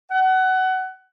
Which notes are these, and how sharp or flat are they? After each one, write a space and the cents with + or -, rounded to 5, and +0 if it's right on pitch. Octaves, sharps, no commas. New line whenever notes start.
F#5 +20